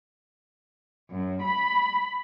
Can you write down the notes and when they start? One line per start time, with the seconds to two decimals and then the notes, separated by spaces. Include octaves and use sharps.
1.10 F#2
1.42 B5